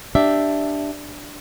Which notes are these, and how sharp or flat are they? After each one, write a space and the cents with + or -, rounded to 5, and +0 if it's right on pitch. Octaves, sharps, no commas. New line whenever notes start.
D4 +0 G4 +0 E5 +0